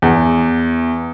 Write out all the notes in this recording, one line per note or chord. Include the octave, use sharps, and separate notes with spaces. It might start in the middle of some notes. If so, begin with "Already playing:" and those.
E2